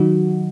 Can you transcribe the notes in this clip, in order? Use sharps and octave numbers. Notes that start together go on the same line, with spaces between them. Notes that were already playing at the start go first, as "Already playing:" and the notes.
Already playing: D#3 F#3 D#4 F#4